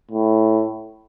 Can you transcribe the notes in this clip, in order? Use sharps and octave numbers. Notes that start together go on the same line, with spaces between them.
A2